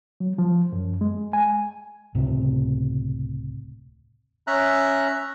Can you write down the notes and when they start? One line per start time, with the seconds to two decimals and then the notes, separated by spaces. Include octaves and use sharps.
0.20 F#3
0.38 F3
0.72 F#2
1.01 G#3
1.33 G#5
2.15 E1 C#2 A2 C3
4.47 C#4 E5 A#5 F#6